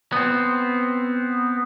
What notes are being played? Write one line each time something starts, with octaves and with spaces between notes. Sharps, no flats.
B3 C4